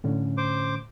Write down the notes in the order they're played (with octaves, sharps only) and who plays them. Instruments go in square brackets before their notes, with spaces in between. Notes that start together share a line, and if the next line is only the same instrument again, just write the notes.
[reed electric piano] A2 D3 C#4
[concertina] C5 D6